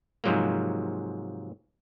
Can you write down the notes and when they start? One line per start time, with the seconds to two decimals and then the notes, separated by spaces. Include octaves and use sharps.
0.24 G#2 C3 F3 F#3 G#3 A#3